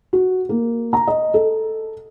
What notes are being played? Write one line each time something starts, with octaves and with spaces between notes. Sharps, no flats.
F#4
A#3
A#5
D#5
A4